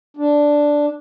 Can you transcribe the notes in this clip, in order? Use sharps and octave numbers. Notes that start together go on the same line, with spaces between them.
D4